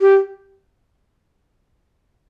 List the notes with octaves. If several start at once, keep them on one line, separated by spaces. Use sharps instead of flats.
G4